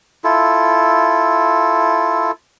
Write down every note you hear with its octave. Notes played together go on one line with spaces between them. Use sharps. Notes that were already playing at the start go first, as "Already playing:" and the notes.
E4 F4 A4